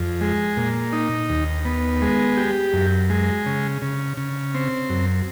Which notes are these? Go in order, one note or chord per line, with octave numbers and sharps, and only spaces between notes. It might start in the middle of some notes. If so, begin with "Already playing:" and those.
Already playing: F2
G#3
A#2
D#4
D#2
B3
G#3
G4
F#2
G#3
C#3
C#3
C#3
C4
F#2